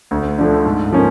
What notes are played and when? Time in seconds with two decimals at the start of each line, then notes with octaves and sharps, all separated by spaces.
0.11 D2
0.38 D3 F3 A3
0.65 G#2
0.92 F3 A#3 C#4